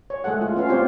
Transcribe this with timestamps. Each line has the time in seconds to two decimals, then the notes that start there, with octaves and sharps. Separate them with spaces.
0.10 C#5
0.24 G#3 A3 G#4 A4 F#5
0.41 F4
0.56 B3 C#4 F4 F5
0.69 C4 F4 G4 C5 C#5